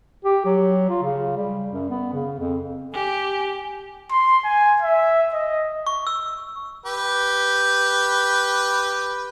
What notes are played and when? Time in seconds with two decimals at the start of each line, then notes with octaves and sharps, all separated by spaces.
0.25 G4
0.46 F#3
0.89 F4
1.03 C#3
1.37 G3
1.72 F#2
1.90 B3
2.13 C#3
2.39 F2
2.93 G4 G#5
4.11 C6
4.45 G#5
4.82 E5
5.33 D#5
5.87 C#6
6.07 E6
6.85 G4 B4